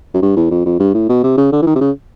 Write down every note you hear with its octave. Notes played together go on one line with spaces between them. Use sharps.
F#2
G2
E2
F2
F2
G2
A2
B2
C3
C#3
D3
E3
D#3
C3
C#3